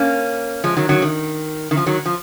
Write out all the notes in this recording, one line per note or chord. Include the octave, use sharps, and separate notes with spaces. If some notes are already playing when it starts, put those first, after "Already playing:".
Already playing: A#3 C#4
F3 G#3
D#3 F#3
D#3 F#3
D#3
D#3
F3
D#3 F#3
F3